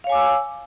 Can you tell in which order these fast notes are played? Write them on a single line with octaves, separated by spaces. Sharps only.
F5 C#5 G#5 D6 E6